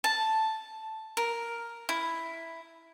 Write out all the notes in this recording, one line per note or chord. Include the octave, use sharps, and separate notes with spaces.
A5
A#4
E4